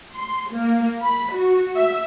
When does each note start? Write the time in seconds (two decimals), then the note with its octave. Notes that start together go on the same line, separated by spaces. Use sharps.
0.14 C6
0.51 A#3
1.02 B5
1.33 F#4
1.76 E5